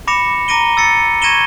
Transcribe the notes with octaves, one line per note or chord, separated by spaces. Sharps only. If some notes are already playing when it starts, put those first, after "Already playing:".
B5 D6 A#6 C#7 E7
A#5 D6 A#6 D7 D#7 G7
E6 A6 A#6 C#7
C#6 G#6 A#6 D#7 E7 G7